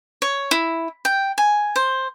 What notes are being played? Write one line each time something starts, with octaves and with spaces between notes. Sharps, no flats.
C#5
E4
G5
G#5
C5